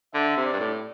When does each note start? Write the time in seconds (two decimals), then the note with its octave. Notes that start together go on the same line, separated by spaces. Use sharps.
0.14 D3 E5
0.37 C3
0.45 D5
0.53 G2
0.60 A2